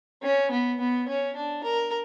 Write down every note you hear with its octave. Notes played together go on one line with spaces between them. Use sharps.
C#4
B3
B3
C#4
D4
A#4